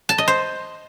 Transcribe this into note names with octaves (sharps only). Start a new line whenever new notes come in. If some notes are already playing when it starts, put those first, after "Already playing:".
A5
D#5
C5